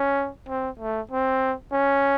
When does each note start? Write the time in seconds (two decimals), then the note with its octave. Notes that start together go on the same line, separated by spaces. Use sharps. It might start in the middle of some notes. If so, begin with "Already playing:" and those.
Already playing: C#4
0.48 C4
0.79 A3
1.11 C4
1.73 C#4